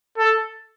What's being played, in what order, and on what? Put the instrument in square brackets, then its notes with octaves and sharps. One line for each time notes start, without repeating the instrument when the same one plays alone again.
[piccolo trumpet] A4